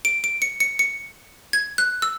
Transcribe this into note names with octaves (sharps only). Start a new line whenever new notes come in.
D7
D7
C#7
C#7
C#7
G#6
F#6
E6